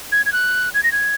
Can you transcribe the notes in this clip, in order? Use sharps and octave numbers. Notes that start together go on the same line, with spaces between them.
G#6
G#6
F#6
G#6
A#6
G#6